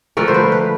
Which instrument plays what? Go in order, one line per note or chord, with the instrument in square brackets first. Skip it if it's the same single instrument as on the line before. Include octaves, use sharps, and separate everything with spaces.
[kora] D3 F3 A3 A#4
C5
B4
B4